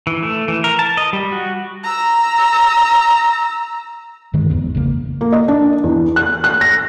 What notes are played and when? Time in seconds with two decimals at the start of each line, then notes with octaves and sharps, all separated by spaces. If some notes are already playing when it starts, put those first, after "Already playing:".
0.07 E3
0.23 A3
0.48 E3
0.64 A#4
0.79 A5
0.97 D#5
1.13 G3
1.32 F#4
1.84 A#5 E6
4.33 G2 D3 D#3 G#3
4.50 F1 E2 B3
4.75 G#1 C#3 A#3
5.21 A#3
5.32 D#5
5.48 D4
5.84 E2
6.16 F#6
6.44 F#6
6.61 A#6